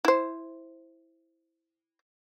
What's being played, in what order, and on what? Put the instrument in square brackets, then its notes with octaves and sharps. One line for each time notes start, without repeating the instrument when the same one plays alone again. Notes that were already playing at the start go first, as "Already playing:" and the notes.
[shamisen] E4 C5